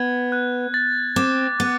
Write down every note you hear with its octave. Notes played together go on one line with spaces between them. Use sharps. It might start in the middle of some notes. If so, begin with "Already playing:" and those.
Already playing: B3 G#6
F#6
A6
C4 D6
B3 F#6